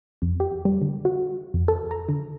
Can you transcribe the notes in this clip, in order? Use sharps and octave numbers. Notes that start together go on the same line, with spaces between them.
F2
G4
G3
D3
F#4
F2
A4
A#5
D3